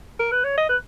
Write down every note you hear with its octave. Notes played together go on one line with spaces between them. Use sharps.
A#4
B4
C#5
D#5
B4